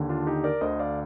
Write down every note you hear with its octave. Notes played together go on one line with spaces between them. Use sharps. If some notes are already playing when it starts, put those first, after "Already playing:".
Already playing: D#2 D3
D4 F4
D#4 G4
A#4 D5
D2 D3 C5 D#5
D5 F5